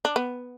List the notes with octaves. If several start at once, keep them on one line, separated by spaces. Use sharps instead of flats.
D4
B3